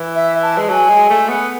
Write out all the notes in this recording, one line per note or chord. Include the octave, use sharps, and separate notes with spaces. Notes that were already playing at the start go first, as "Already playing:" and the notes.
Already playing: E3
E5
A5
G#3
F#3 G#5 A5
G#3
A3
B3